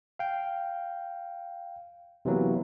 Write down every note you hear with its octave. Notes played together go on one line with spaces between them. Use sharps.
F5 G5
C3 E3 F#3 A#3 B3